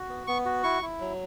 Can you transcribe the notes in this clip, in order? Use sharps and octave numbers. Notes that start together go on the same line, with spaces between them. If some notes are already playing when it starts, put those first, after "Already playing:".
Already playing: F#4
B3
B3 C#6
F#4
E4 C#6
E4
F#3